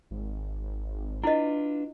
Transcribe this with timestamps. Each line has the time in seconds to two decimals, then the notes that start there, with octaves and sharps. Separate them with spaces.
0.11 G#1
1.24 D4 E4 F4 B4 D#5